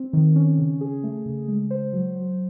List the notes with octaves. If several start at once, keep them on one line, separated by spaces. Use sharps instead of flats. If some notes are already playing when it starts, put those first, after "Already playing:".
Already playing: C4
D#3
C#4
C#3
G#4
A3
C#3
G#3
C5
F#3
F#3